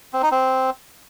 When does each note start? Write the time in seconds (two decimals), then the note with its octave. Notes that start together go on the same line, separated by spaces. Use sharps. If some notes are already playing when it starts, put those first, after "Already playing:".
0.13 C4
0.22 D#4
0.32 C4